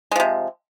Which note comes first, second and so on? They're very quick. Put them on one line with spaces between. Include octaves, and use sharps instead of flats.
G#3 F3 C3